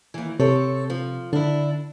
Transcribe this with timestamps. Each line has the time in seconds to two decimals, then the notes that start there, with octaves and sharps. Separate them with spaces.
0.14 D#2 E3
0.40 C3 C4 A4 C#5
0.90 F3
1.33 D3 D4 E4